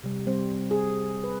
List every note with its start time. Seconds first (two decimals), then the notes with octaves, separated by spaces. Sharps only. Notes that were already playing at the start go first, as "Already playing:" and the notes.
0.04 C3 G3
0.27 G3 C4 C5
0.71 G#4
1.24 B4